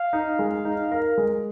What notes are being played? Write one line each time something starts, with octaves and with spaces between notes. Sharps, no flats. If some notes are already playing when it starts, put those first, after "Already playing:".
Already playing: F5
D#4
G#3
D#4
A#4
G#3